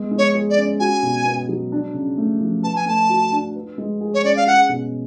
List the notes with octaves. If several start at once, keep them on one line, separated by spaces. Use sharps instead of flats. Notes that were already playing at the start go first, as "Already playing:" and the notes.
Already playing: G#3 B3
G#3
C#5
G#4
D5
C#4
F#4 G#5
B2
B3
F#3
D4
C#3
A3
F3
B4 A5
G#5
A3 A5
F#4
D4
B4
G#3
G#4
C#5
C#4 D5
F5
G#4 F#5
B2